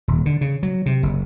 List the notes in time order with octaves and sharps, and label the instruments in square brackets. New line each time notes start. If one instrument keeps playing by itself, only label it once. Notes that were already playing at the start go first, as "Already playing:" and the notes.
[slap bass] D#1
D3
C#3
F#3
C3
F#1